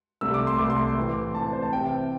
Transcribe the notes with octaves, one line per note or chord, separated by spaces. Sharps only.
C2 C3 A3 E6
D6
C6
C2 C3 A3 D6
C6
A2 E3 C4
A2 E3 C4 A5
A5
C5
A5
C3 E3 C4 E4 G5